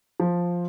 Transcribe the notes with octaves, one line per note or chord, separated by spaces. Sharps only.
F3